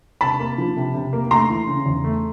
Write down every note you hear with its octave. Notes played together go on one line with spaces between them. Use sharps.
C3 A5 B5
A#3
F3
C3
C3
A#3
A3 A#5 C6
E3
C#3
E2
A3